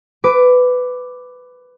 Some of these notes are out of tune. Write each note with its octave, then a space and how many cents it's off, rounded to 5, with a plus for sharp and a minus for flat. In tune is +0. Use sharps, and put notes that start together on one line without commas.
B4 +15 D6 +0